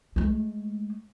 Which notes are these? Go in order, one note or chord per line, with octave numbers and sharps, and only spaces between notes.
G#3 A3